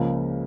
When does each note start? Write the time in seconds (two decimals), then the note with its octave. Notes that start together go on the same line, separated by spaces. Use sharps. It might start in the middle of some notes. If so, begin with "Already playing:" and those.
Already playing: C#2 C#3 F3 A#3